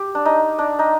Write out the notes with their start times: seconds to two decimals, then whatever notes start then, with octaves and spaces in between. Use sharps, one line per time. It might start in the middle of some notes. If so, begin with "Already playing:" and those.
Already playing: G4
0.15 D4
0.25 D#4
0.59 D4
0.79 D#4